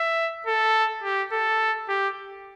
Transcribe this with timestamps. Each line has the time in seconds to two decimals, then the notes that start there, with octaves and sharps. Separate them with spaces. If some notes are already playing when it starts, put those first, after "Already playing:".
Already playing: E5
0.47 A4
1.03 G4
1.32 A4
1.89 G4